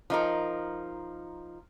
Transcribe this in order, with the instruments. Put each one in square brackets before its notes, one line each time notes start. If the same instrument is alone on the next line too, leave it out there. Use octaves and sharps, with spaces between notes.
[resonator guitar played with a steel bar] F3 D#4 A#4